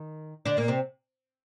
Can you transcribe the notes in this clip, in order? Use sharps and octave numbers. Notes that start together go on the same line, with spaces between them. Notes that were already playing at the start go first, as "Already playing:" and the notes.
Already playing: D#3
D3 D4
A#2 A#3
C3 C4